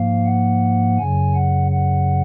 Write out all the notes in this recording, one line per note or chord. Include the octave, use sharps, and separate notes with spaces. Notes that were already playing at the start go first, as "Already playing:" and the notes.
Already playing: G#2 F3 A#3 F5
F#5
F#2 C#3 F#3 G#5
F#5
F#5